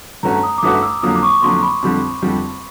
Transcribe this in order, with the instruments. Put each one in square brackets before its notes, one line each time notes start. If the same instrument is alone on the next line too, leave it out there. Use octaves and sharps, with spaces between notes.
[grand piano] G2 E3 A3 C#4 F#4 [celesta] A#5
[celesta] D#6
D6
[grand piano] G2 E3 A3 C#4 F#4 [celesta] D#6
[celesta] E6
[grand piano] F2 D3 F#3 A#3 [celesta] D#6
[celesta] D6
C#6
[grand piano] F2 D3 F#3 A#3 [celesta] C6
[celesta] B5
[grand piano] F2 D3 G3 C4
F2 D3 G3 C4